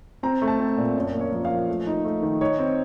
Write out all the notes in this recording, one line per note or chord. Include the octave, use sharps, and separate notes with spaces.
C4 A#5
A3
A5
C4
A#2
F#2 C#5
A#3
C#5
F3
F5
F3
A3
D#4
A3
D#3
D#4 C#5
C4